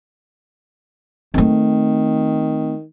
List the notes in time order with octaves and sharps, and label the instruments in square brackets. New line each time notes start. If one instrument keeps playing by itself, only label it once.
[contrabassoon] D#3 [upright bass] A3 C4